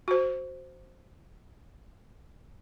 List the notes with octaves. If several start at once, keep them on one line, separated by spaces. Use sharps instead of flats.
F#4 C5